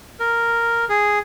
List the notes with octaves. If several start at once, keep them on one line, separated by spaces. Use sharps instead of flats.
A#4
G#4